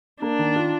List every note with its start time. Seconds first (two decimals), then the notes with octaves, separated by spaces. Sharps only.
0.22 A#3 D4
0.39 D#3
0.56 F4